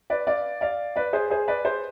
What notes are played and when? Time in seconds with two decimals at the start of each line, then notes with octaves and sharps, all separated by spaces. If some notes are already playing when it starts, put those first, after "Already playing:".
0.10 B4 D5
0.27 D5 F5
0.61 D5 F5
0.96 B4 D5
1.13 G#4 C5
1.30 G#4 C5
1.48 B4 D5
1.65 G#4 C5